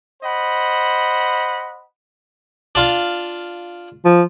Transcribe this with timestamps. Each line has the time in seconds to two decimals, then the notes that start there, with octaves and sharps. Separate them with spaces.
0.23 C5 D#5 F#5 B5
2.75 D4 F4 F5
4.05 F3